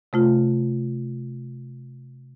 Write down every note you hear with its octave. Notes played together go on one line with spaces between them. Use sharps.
C3 A3 F4